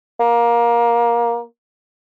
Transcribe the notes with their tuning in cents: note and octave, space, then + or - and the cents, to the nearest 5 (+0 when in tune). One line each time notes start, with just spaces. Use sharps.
A#3 +20